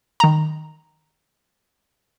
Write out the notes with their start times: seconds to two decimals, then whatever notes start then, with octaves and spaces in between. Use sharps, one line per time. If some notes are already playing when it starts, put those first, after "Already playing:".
0.20 D#3 A#5